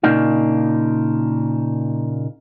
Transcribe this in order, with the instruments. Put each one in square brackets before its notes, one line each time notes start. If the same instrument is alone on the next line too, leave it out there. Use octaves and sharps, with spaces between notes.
[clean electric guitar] A#2 C#3 A#3 D4 D#4 F4